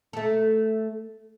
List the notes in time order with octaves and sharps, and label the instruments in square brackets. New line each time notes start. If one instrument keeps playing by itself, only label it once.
[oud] A3 A4